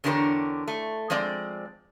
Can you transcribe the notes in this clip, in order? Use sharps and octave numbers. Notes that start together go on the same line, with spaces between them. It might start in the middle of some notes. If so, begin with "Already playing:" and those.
E2 D3 D4 G4 A#4 C#5
A3
F3 G#3 C4 D5